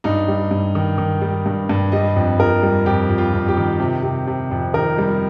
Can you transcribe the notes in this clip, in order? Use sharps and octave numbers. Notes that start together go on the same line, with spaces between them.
G2 D#4
G3
G2
D#3
D#3
G3
G2
G2
G3 D#5
F2
F2 A#4
G3
F2 G4
F2
F4
F2
G4
D#3
C3
C3
C3
F2
D#3 A#4
G3